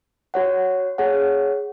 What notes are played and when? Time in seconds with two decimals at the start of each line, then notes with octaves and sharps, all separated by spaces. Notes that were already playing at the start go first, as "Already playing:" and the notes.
0.34 F#4 C#5 F#5
0.98 G#4 C#5 F#5